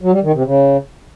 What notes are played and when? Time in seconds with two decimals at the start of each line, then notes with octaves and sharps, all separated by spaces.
0.01 F#3
0.12 G3
0.23 D#3
0.34 C3
0.45 C#3